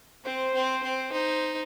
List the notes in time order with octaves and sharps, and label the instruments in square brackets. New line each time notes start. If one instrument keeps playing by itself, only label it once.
[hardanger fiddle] C4 [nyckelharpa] C5
[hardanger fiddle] C4
C4
[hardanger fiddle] D#4 [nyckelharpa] C5